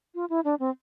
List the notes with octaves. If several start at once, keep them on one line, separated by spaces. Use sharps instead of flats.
F4
E4
D4
C4